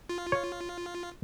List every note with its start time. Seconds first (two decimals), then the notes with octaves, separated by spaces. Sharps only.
0.09 F4
0.32 C#5